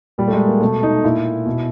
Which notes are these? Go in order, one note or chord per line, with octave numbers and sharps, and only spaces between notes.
A#2 G3
A3
G#3
A#3
B2 A3
D#4
A#2 E4
B2